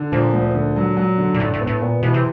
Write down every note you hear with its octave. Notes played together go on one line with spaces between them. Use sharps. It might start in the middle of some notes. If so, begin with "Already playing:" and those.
Already playing: D3
A#2 F3
D2
D3
F#3
F#3
D3
A#2
A2 D4
A2
B3
A2
A#2 B3
B2 E3
C3